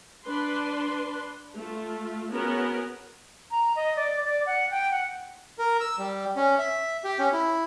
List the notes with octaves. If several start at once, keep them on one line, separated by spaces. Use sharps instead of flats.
D4 B4 C6
A3 F4
B3 C#4 F#4 G#4 A#4
A#5
D#5
D5
D5
F#5
G5
F#5
A#4
E6
G3
C#4
E5
G4
C#4
E4